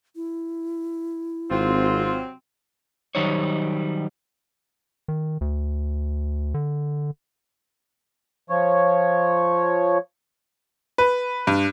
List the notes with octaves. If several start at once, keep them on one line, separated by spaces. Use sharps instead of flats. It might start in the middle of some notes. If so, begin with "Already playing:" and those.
E4
G#1 C3 F#3 C4 F4
D#3 F#3 G3 D#4 C5 C#5
D#3
D2
D3
F3 C#5
B4
G2